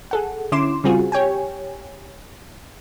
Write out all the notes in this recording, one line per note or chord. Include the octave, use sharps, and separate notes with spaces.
G#4 A4 F#5
D3 C#4 E4 C6 D6 E7
C#3 G3 C4 F4 F#4 G#4
G4 C#5 G5 G#5